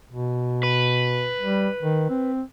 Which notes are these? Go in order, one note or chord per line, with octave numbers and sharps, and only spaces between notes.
B2
B4
G3
D#3
C4